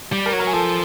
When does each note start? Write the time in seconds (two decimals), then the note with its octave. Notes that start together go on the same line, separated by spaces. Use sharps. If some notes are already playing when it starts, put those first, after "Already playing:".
0.12 G3
0.26 A#4 A#5
0.33 F#3
0.39 A#4 A#5
0.47 G#5
0.53 F3 A4 A5